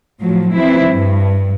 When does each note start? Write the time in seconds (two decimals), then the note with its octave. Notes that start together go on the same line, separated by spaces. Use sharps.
0.21 A2 F3 F#3
0.55 E3 C4 E4
0.86 G2